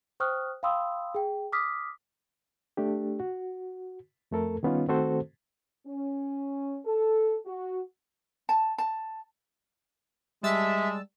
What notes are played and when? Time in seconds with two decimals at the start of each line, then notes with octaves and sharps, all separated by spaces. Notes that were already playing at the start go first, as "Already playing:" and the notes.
0.20 C5 G5 C#6 D#6 F6 F#6
0.63 F5 G5 B5 C6 D#6 E6
1.15 G#4 G5
1.52 D6 D#6 F6 B6
2.77 A3 D4 G4
3.20 F#4
4.31 F2 A3 A4 A#4
4.63 D#3 G3 B3 C#4 D#4 F4
4.88 D#3 A3 C4 F#4 A4 C5
5.87 C#4
6.85 A4
7.46 F#4
8.49 A5
8.78 A5
10.43 G3 G#3 E5 A5 E6